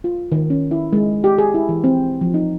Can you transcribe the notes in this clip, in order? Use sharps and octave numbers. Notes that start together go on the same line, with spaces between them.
F4
D#3
C#4
E4
G#3
G4
G#4
E4
E3
C4
F3
D#4